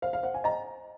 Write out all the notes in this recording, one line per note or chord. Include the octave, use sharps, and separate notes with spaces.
C5 F5
F5
C5 F#5
G#5
D#5 A#5